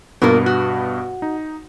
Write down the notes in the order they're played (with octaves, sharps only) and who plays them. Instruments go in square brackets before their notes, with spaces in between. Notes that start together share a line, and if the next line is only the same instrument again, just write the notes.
[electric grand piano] G2 B2 B3 [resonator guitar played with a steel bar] A#3 F4 A#4
[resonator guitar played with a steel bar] F#4
[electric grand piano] D#4